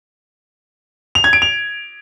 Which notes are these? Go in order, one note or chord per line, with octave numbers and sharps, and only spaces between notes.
F7
G#6
D7
F7